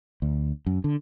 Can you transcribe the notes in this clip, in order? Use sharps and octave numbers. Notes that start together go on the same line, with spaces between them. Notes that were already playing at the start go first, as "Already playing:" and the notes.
D2
F#2
D3